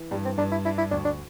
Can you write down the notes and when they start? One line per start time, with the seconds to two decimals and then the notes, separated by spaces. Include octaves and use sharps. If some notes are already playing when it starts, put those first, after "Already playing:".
Already playing: E3
0.11 G2 G3
0.25 C4
0.38 G2 D4
0.51 E4
0.65 D4 E4
0.78 E4
0.91 D2 D4
1.05 D4